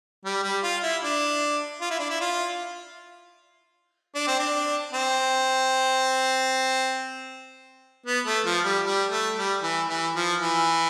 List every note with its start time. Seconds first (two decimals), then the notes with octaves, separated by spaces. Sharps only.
0.25 G3
0.44 G3
0.63 F4
0.83 E4
1.03 D4
1.81 F4
1.90 E4
2.00 D4
2.10 E4
2.21 F4
4.15 D4
4.27 C4
4.39 D4
4.93 C4
8.06 B3
8.26 A3
8.45 F3
8.65 G3
8.85 G3
9.11 A3
9.36 G3
9.62 E3
9.89 E3
10.16 F3
10.41 E3